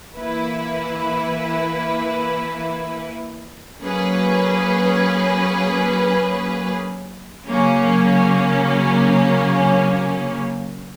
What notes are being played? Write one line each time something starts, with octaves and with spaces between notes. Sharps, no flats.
E3 A#3 E4 B4
F#3 A#3 C#4 G#4 B4
C#3 F#3 A#3 C#4